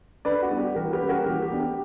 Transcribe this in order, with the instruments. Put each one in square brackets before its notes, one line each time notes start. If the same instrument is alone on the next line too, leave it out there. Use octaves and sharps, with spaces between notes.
[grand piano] D3 B4 D5
F#4
G3 B3 D4
G4
E3 F#4 A#4
G4 B4
G3 A#3 C#4
F#4 A#4
E3 G4
G4
B3 D4
G4